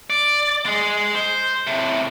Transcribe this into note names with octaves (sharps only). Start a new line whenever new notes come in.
D5
G#3 G#4
C5
A2 C3